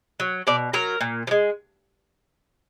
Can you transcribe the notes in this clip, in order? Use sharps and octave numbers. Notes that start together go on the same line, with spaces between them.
F#3
B2 D5
F#3 A#4
A#2
F3
G#3